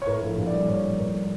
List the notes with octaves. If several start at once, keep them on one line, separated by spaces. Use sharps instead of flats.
C#5
A2 A#4
A#1
A#1
D5
G3
A#1 C#5
A#1
A#1 A#4
G3